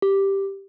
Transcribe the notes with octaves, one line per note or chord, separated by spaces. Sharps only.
G4